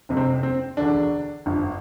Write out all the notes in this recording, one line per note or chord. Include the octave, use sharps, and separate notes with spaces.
G1 F2 C3
C4
C4
E1 D2 D3 D4
G1 G2 F3